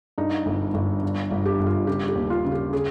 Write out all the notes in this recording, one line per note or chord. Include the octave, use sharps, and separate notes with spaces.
G2 D#4
G1
G1
G2
G1
G4
G1
F4
C#3 G4
G4
D#2
F4
C#3
G4
C#3 G#4